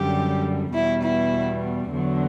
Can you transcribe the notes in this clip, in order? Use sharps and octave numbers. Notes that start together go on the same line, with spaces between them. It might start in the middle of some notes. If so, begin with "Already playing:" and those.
Already playing: F#2 D3 G3 G4
E2 B2 G3 E4
E4
E2 D3 F#3